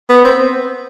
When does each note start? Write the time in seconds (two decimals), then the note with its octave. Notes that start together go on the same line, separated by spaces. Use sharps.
0.09 B3
0.25 C4